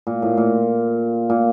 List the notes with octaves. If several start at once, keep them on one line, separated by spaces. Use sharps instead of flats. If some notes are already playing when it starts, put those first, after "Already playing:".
A#2
A2
A#2
A#2